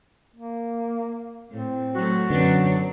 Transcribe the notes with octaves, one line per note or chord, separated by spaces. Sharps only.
A#3
A2 C4
F#3 A3 F#4
F#2 D3 F#3 B3 D4